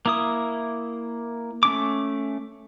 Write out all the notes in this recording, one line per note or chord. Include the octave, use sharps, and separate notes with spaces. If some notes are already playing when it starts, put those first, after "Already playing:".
A#3 E4 D#6
A3 C#4 D6